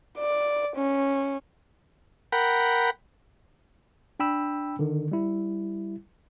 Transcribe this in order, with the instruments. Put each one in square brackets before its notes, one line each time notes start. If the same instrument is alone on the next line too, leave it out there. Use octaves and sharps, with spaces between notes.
[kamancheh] D5
C#4
[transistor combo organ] A#4 F#5 G5 B5
[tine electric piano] D4 G5 B5 E6
D3 D#3
G3 E4